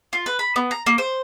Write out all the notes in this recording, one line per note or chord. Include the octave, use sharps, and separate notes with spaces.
F4
B4
B5
B3
A#5
A#3
C5